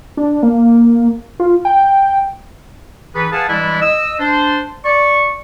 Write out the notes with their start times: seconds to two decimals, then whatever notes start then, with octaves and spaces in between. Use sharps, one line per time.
0.17 D4
0.43 A#3
1.40 F4
1.65 G5
3.15 E3 D#4 G#4 A4 B4
3.32 G#4 B4 F5 F#5 G#5 A5
3.48 E3 G3 G#3 D4 E4
3.81 D#5 E6
4.20 D4 C5
4.85 D5 C#6